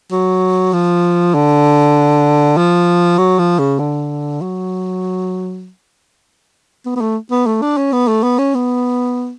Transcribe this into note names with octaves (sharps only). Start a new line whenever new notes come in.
F#3
F3
D3
F3
F#3
F3
C#3
D3
F#3
B3
B3
A3
B3
A3
D4
C#4
B3
A3
B3
C#4
B3